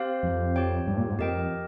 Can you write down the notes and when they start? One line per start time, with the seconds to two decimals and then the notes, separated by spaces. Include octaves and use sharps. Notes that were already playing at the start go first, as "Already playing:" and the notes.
Already playing: C4 G4 C5 F5
0.23 F2
0.56 G4 C#5 G5
0.87 G2
0.97 A#2
1.08 G#2
1.19 F2 G4 A#4 D#5 G5